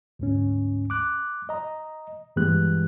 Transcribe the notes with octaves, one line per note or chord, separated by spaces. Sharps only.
D2 G#2 C#4
D6 F#6
D#5 A#5
G2 E3 G#3 B3 G4 F#6